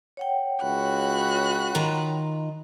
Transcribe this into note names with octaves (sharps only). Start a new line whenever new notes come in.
C#5 F#5 G5
C#2 F#4 B5 F#6
D#3 F4 A#5